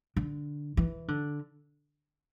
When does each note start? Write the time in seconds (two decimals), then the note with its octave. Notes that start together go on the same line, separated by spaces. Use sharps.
0.16 D3
0.77 E3
1.08 D3